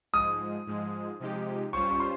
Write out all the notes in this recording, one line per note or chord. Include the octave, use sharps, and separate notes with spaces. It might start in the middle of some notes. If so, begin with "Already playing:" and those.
G#2 F3 G#3 D#6
G#2 F3 G#3
C3 F3 G#3 D#4 G4
G2 G3 C#4 F4 C5 C#6
C#6
C6